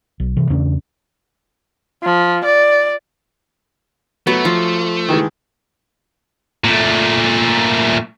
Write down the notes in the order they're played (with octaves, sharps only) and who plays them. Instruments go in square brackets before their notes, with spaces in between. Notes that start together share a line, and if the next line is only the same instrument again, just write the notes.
[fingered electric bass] B1
C3 E3
E2 C#3 C#4 D4
[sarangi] F3
D5
[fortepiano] F#3 [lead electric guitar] A3 [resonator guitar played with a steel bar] B3
[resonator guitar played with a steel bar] F3
[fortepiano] D#3 E3 G#3
[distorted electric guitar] A#2 A3